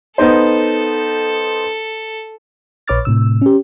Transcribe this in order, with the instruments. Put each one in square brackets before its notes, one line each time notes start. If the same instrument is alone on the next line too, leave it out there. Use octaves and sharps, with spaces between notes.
[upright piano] B3 D#4 C5 [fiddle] A4
[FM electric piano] A#1 B4 C#5 D6 F6 A6
A2 C3 E6
C#4 G4